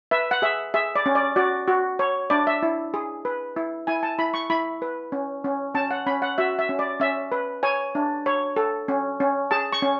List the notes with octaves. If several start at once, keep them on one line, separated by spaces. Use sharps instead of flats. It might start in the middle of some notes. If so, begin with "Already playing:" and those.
B4 E5
F#5
G#4 E5
G#4 E5
D5
C#4
D5
F#4 D5
F#4
C#5
D4 D5
E5
E4
G#4
B4
E4
E4 G#5
A5
E4 B5
C#6
E4 B5
B4
C#4
C#4
C#4 A5
F#5
C#4 B5
F#5
F#4 E5
E5
C#4
D5
C#4 E5
B4
C#5 G#5
D4
C#5
A4
C#4
C#4
G#4 A5
C#6
C#4